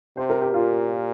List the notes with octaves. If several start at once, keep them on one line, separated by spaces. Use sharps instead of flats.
C3 C5
A#4
G4
A#2 F4